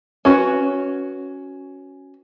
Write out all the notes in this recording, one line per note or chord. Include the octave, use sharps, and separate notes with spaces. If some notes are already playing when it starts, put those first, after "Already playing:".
C#4 F#4 B4